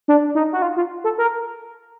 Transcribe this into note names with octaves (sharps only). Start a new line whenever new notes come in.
D4
D#4
F#4
F4
F4
A4
A#4